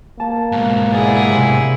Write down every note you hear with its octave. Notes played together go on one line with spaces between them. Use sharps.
A#3 A5
G#2 B2
E4 G#4 D5 F#5
C3